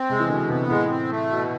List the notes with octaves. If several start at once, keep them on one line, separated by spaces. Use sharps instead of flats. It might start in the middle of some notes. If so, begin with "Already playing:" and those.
Already playing: C4
C3 G#3
E3
B2 D3
C3 B3
A2 G#3
C4
A3
B2